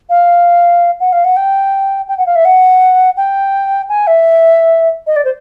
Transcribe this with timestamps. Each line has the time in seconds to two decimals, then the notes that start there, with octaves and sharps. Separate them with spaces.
0.10 F5
1.00 F#5
1.12 F5
1.24 F#5
1.37 G5
2.08 G5
2.18 F#5
2.26 F5
2.36 E5
2.45 F#5
3.17 G5
3.89 G#5
4.07 E5
5.07 D#5
5.16 D5
5.25 C5